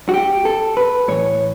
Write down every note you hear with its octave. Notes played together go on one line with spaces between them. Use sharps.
F#4
G4
A4
B4
A2 E3 C#5